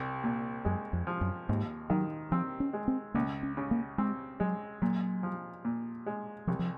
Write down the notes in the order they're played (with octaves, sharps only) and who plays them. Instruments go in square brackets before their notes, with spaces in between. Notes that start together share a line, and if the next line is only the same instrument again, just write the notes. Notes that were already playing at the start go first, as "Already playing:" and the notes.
Already playing: [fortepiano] C2
A#2
[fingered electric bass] F#2 [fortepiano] G#3
[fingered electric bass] F2
[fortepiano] F3
[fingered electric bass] F#2
[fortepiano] D#2 [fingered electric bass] G#2
[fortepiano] D#3 [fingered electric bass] F#3
[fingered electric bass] F3 [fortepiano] C4
[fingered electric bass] C#4
[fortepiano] G#3
[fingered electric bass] C4
[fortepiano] C#2 [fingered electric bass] A#3
[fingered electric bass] C#4
[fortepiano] C#3
[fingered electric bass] A#3
[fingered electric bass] G#3 [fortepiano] C4
[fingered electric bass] F#3 [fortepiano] G#3
[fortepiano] A#2 [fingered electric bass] F#3
[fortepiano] F3
A#2
G#3
[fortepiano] C2 [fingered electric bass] F3
[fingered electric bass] F3